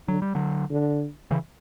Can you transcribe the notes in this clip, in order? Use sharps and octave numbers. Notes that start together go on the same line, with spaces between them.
D3 F#3
G3
D3 F#3
D3
C#3 E3